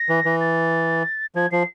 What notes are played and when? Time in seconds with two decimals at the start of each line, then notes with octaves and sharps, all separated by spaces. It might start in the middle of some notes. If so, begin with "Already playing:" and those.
Already playing: A#6
0.09 E3
0.25 E3
0.41 A6
1.35 F3 G#6
1.52 F3 C7